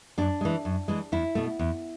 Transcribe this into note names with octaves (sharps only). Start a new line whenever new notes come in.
F#2 D4
E3 G#3
F#2
E3 G#3
E2 E4
B2 A3
E2